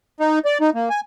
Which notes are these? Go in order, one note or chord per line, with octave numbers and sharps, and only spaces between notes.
D#4
D5
D#4
A#3
G#5